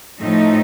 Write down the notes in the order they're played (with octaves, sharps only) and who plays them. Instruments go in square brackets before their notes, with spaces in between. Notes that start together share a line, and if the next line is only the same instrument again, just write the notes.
[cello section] A2 F3 A3 D#4